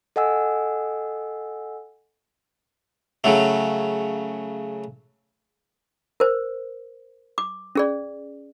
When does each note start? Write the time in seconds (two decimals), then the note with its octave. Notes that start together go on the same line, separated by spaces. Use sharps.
0.16 A4 D#5 F#5 G#5 E6
3.24 C#3 F#3 A3
6.20 A#4 C5
7.38 D6
7.75 C#4 G#4 D5